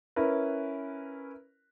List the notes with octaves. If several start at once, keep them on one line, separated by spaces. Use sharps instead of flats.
C#4 E4 A#4 B4